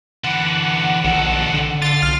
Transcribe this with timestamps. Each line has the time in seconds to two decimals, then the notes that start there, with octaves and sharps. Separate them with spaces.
0.24 D3 E3 F#5
1.04 A#1 D#3 A4
1.54 D3
1.82 F4 A6
2.03 B1 F6